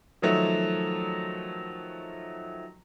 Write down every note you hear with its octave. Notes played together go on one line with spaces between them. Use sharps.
D#3 F3 F#3 A3